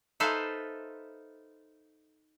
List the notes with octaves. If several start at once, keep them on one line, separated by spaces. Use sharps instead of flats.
D#4 A4 B4 C5 E5 F5